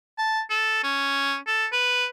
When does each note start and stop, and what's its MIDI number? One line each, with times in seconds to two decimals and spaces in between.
0.18 0.42 81
0.50 0.80 69
0.84 1.37 61
1.47 1.67 69
1.72 2.06 71